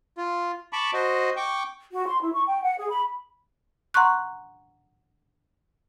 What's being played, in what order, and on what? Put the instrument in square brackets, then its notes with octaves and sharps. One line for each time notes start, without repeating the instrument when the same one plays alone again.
[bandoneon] F4
A5 B5 C#6 D6
F#4 C5 D#5
G5 C#6 D6
[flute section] F#4
C6
E4
C#6
G5
F#5
G#4
B5
[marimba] F#5 A#5 C6 C#6 F#6